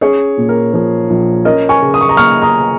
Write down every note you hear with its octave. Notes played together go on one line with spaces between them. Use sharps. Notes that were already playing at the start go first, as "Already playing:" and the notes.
C#4 G#4 C#5
A#2
A#4
F3
A#1
C#4 A#4 D#5
G#5 C#6
C#3
D#6
C#6
A#5 D#6
A#3 C#6 F6
A#5 D#6